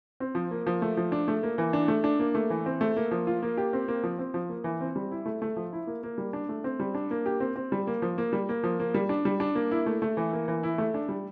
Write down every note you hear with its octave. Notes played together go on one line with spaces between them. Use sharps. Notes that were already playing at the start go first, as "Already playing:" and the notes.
C4
F3
A#3
F3
A3
F3
D4
A3
A#3
E3
D4
A3
D4
A#3
A3
E3
C4
A3
A#3
F3
F4
A#3
G4
C4
A#3
F3
C4
F3
A#3
E3
C4
G3
E4
A3
A3
F3
E4
A#3
A#3
G3
D4
A3
C4
G3
D4
A#3
G4
C4
C4
G3
A#3
F3
A#3
G3
A#3
F3
A#3
G3
D4
G3
D4
A#3
E4
A3
A3
E3
A#3
E3
E4
A3
D4
G3